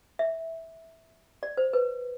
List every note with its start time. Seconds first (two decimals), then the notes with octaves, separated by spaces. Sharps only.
0.19 E5
1.43 D5
1.57 C5
1.73 B4